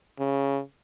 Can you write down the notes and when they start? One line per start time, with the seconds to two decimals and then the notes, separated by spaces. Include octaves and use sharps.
0.19 C#3